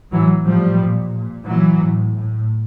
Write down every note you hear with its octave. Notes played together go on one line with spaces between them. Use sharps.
A2 E3 F#3
A2 F3 G3
A#2
A#2
A#2 E3 F#3
A2
A2